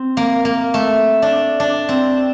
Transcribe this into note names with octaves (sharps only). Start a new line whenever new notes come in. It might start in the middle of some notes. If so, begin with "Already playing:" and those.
Already playing: C4
A#3
A#3
A3
D4
D4
C4